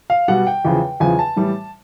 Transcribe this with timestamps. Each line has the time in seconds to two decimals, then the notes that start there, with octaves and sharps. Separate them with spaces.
0.10 F5
0.28 B2 G3 F#5
0.47 G5
0.65 E2 C#3 F3
1.00 E2 C#3 F3 G#5
1.19 A5
1.36 A2 E3 G3